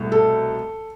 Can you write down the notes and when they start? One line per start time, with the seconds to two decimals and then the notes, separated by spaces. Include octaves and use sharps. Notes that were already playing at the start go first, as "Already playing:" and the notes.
Already playing: C2 B2 A3
0.12 A4